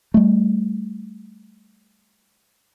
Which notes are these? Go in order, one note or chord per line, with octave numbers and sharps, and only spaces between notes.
G3 A3